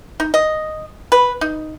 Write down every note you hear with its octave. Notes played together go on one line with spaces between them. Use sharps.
D#4
D#5
B4
D#4